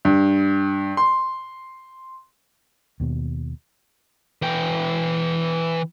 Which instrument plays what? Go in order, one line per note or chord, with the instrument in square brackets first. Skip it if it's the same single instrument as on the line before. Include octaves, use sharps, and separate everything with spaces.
[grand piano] G2
C6
[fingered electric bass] D#2 B2
[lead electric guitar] E3 G5